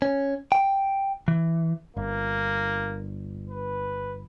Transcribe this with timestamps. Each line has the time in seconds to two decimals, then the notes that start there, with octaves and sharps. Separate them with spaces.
0.02 C#4
0.52 G5
1.28 E3
1.97 G1 A#3
3.50 B4